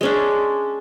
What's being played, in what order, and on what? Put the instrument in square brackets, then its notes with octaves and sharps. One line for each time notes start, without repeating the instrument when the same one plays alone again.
[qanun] G#3 C#4 D4